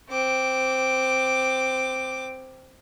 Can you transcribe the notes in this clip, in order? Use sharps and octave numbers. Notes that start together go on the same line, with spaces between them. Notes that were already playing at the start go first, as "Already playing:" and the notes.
C4 D6